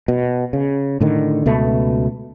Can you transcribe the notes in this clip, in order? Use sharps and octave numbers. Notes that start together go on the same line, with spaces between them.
B2
C#3
A2 D3 D#3
C#2 B2 A3